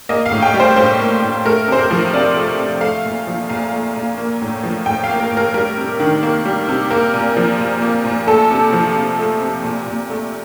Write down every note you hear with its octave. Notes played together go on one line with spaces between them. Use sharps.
A#3 D#5
F5
A2
G5
G3
C5
A2 C5
A#3
A2
A3 A#4
C3 C5
A#4
F3
C3 D5
A3
C3
A3 F5
A#2
F3
A#2 F5
A3
A#2
A#3
A2
F3
A2 G5
F5
A#3
A#4
A2
A#4
G3 A#4
C3
D#3
A#3
G3
C3
A#3 A#4
A#2
F3
A#2
A#3
A#2
A3 A4
C3
F3
C3
A3
C3
A#2
A#2
A3